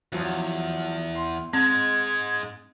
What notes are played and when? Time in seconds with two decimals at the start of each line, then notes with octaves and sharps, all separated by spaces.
0.12 E2 F3 F#3
1.15 C6
1.53 G#2 G#3 C4 G#6